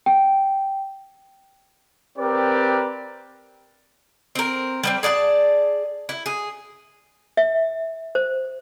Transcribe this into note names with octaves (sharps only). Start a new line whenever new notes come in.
G5
C4 G4 A#4 B4 D5
C4 A#4
G3 B3 C4
G#4 D5 F#5 A5
E4
G#4
E5
C5